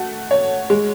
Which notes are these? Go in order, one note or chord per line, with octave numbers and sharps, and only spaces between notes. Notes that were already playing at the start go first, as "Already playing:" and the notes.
Already playing: A3 F#4
C#5
G#3